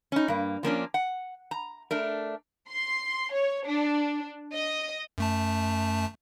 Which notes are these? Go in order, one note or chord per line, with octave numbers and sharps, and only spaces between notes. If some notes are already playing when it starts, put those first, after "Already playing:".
C#4 D#4
G2 A#3
F3 A#3 C#4 D4
F#5
A#5
A3 D4 A#4
C6
C#5
D4
D#5
F#2 A3 A5